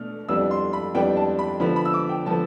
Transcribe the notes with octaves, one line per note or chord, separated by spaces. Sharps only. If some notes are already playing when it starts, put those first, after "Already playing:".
Already playing: B2 A3 D4 F6
F2 E3 G3 B3 D4 E6
C6
B5
F2 E3 G3 B3 D4 G5
A5
B5
D3 F3 B3 B5
B5
E6
D6
G5
D3 F3 B3 A5